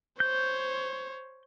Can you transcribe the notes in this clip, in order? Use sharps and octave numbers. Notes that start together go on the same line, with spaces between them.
C5 C#5 G6